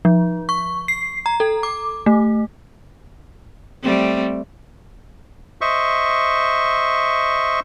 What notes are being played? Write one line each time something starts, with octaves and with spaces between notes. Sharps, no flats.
F3
C#6
C7
A#5
A4
D6
A3
G3 A3 C4
C5 D#5 E5 C#6